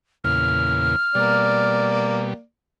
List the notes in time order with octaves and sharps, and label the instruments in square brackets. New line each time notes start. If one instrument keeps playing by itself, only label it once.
[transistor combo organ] E2 A#2 C#3 [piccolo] F6
[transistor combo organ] B2 G3 [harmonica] A#3 D5